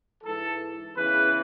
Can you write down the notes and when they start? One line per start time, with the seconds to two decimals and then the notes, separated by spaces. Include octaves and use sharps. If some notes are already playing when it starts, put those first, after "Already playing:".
0.24 G#2 E3 A4
0.96 E2 C#3 E3 B4